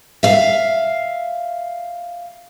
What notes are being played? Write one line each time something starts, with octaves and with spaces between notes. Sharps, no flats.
E5 F5